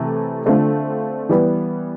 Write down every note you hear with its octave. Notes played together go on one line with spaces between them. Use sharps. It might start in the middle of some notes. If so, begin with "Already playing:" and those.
Already playing: C3 E3 A3
D3 A3 C4 F4
E3 G3 B3